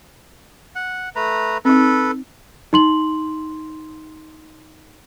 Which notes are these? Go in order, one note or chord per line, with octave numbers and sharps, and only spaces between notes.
F#5
A3 B4 A#5
C4 D#4 A4 B4
D#4 C6 F#7